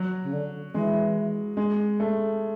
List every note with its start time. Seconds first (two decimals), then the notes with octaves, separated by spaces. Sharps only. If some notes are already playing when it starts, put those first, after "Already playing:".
Already playing: F#3
0.23 C#3
0.33 D3
0.74 E3 G#3
1.57 G#3
2.00 A3